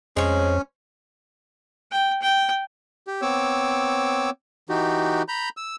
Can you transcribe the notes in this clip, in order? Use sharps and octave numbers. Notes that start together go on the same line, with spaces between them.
F2 G#3 C#4 C5 C#5
G5
G5
G4
B3 C4 C#5 D6 E6
E3 D#4 F#4 G4
A#5 B5 G6
E6